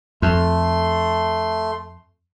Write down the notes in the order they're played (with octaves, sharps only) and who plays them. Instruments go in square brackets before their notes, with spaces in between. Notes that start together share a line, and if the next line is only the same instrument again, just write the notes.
[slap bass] F2 [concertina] A3 C6